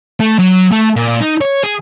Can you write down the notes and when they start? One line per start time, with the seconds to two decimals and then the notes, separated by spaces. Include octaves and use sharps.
0.20 A3
0.39 F#3
0.72 A3
0.96 A#2
1.20 D#4
1.41 C#5
1.64 G#4